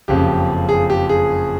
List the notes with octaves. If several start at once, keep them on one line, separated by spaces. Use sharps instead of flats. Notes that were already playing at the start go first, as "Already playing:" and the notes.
F#1 F2 C#3 F3 G4
G#4
G4
G#4